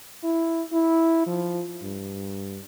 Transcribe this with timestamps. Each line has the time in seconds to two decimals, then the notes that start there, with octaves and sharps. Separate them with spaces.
0.23 E4
0.73 E4
1.27 F3
1.83 G2